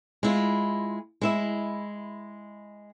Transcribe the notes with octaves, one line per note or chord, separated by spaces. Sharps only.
G#3 E4 F4
G#3 E4 E5